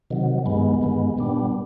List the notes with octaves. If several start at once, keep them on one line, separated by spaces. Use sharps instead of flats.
C3 D#3 F#3
G2 D#3 G#3 B3
G2 D#3 G#3 B3
A#2 G3 B3 D4